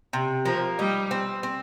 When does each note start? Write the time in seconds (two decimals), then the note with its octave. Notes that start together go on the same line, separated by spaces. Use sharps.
0.13 C3
0.45 F3 A#3
0.79 G3 D#4
1.11 C4
1.43 C4